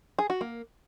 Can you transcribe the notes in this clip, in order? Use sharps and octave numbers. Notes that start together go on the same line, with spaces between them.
G#4
F#4
A#3